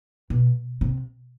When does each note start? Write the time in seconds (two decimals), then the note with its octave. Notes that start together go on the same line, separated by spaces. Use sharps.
0.30 B2
0.81 C3